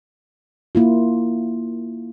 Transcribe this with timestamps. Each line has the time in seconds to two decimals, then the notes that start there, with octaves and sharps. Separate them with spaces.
0.75 A#3 E4 F4